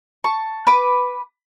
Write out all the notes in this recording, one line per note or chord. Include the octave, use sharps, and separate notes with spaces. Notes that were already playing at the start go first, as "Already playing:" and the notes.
A5 C#6
B4 D6